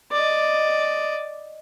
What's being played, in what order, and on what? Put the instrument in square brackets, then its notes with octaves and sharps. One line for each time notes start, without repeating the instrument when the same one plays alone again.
[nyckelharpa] D5 D#5